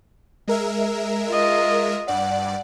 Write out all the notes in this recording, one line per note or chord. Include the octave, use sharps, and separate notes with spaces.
G#3 A#4 E5
F4 D#5
G2 D5 F#5